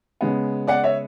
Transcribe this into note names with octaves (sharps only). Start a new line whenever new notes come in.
C#3 G#3 B3
D5 F#5
C#5 E5